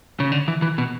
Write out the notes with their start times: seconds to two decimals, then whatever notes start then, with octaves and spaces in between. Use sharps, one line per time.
0.20 C#3
0.32 D3
0.48 E3
0.62 E3
0.78 B2